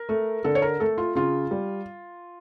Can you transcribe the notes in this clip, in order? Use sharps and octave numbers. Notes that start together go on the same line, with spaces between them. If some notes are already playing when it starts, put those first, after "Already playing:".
Already playing: A#4
A3
D3 A4
C#5
A#4
A3 A4
F4
C#3 F4
G3